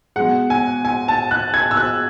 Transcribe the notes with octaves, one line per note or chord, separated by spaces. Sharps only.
B2 G#3 F#5
G#5
G#5
A5
F#6
G#6
E6
F#6